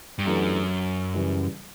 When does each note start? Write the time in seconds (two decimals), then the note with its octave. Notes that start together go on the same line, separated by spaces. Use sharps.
0.19 G2
0.25 F#2 E3 A3 D4 G4
1.14 C#3 E3 G3